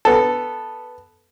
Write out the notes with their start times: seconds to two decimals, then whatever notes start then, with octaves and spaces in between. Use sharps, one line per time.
0.05 B3 A4